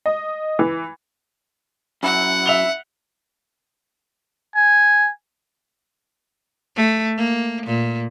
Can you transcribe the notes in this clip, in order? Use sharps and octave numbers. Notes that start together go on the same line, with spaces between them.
D#5
E3
F#2 E4 F#5
E5 F7 G7
G#5
A3
A#3
A#2